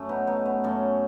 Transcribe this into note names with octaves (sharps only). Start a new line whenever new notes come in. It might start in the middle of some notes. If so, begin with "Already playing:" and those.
Already playing: F#2 A3 C#4
B3 D#4
A3 B3 D#4
B3
F#2 A3 C#4